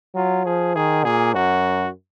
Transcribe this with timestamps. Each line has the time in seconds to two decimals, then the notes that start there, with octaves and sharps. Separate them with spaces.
0.15 F#3 F4
0.45 F3 G#4
0.76 D#3 G#4
1.05 A#2 G#4
1.35 F#2 F#4